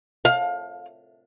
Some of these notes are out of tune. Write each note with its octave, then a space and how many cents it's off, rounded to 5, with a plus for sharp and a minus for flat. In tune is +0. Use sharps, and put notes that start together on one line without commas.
F5 +25